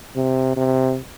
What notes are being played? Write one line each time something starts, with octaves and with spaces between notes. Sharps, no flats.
C3
C3